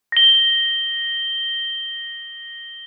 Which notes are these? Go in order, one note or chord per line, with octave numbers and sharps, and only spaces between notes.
A#6 G7